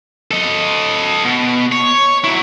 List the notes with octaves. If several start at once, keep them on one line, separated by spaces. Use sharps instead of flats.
A4 D#5
B2
C#5
F#3 E4